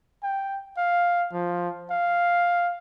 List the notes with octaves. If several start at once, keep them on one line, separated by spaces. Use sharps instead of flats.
G5
F5
F3
F5